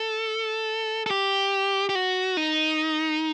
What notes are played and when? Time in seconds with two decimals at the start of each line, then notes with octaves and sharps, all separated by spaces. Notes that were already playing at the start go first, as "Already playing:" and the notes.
Already playing: A4
1.06 A4
1.10 G4
1.89 G4
1.95 F#4
2.37 D#4